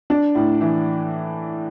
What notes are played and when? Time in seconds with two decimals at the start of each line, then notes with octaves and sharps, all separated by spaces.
0.10 D4
0.35 A2
0.61 E3